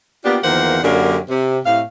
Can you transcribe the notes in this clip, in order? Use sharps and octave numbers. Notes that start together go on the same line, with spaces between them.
A#3 B3 D4 F4 G4
E2 D#3 F3 A#3 C5 F#5
F#2 D3 F#3 A#3 D4 G4
C3
A2 C3 F5